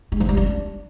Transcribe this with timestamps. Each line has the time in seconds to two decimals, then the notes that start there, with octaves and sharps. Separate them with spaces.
0.12 G#3
0.20 F3
0.29 G3
0.37 D4